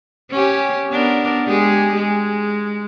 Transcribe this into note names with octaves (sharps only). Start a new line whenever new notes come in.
C#4 G4
B3 D4 A#4
G#3 G4 G#4
G#3